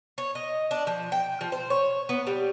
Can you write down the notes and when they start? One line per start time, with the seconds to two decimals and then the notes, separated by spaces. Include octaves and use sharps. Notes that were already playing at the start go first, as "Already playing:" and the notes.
0.18 C#5
0.35 D#5
0.71 D4
0.87 F3
1.12 G5
1.41 F3
1.52 C5
1.70 C#5
2.09 B3
2.27 G3